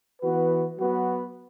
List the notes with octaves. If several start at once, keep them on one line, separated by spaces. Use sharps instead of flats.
E3 B3 F#4 B4
F#3 B3 F#4 B4